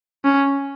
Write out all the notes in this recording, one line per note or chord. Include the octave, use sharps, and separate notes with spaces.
C#4